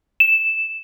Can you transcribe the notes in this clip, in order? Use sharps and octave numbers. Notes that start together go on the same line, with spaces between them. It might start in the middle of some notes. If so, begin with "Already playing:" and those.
E7